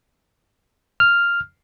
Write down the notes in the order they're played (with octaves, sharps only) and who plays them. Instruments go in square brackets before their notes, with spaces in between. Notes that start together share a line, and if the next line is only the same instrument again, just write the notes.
[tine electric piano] F6